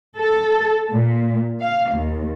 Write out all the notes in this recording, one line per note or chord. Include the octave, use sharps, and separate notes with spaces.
A4
A#2
F5
D#2